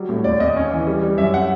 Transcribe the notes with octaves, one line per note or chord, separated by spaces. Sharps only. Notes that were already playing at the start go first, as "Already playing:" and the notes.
Already playing: F#3 G3
A2
D#2 D5
D#2 D#5
C#4
E3
G3
G3
F#2 E5
F#5